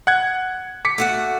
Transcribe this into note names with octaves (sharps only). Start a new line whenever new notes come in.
F#5 F#6 G#6
D6 B6 C#7
A3 F#4 F#5